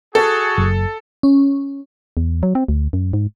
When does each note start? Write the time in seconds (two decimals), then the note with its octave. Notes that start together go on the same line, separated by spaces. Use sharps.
0.15 F#4 G#4 A4
0.58 F#1
1.23 C#4
2.17 E2
2.43 F#3
2.55 C4
2.68 D2
2.93 F#2
3.13 G#2